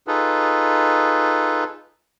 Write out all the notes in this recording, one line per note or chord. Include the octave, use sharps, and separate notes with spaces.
D#4 F4 G#4 A4 B4